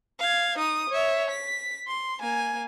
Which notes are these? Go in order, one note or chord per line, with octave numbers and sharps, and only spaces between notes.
F5 G#6
D#4 D#6
C#5 E5
B6
C6
A#3 G#5